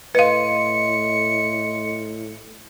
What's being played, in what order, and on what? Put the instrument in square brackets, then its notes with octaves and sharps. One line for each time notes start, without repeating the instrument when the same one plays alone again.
[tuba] A2 [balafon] B4 F5 [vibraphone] D#5 C6 [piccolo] C#7